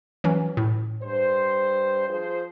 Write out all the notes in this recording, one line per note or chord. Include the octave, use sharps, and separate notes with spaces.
E3 F#3 C#4
A2
G2 C5
F3 G#4 C5